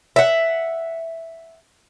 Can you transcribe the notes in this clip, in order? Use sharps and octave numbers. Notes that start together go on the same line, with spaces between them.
E5 F#5